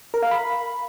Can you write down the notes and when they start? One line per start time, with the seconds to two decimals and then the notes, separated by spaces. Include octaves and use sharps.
0.14 A#4
0.23 F5
0.31 B5